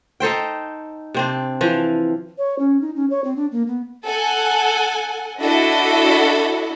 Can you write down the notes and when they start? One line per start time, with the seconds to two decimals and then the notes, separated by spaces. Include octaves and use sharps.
0.20 D#4 A4 C5 G5
1.14 C3 C4 D4
1.61 E3 F3
2.38 C#5
2.59 C#4
2.81 D#4
2.96 C#4
3.10 C#5
3.24 C4
3.36 D4
3.52 A#3
3.67 B3
4.07 A4 F#5 G#5
5.39 D4 E4 F#4 A4 D#5 E5